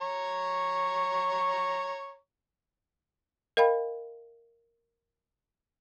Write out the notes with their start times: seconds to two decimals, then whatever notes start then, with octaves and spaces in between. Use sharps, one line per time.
0.01 C#5 A#5 C#6
3.57 A#4 D#5 F5 G5 B5